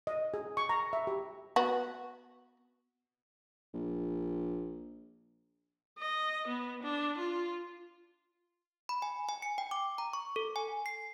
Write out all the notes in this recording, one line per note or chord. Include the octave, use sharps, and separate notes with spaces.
D#5
G#4
C#6
A#5
E5
G4
B3 F#4
A#1
D#5
B3
D4
F4
B5
G#5
G#5
C#7
G5
D6
A#5
C#6
A4
G#5
C7